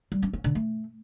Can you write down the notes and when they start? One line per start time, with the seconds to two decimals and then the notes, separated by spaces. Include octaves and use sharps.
0.12 G3
0.23 C#4
0.33 C#4
0.44 D3
0.55 A3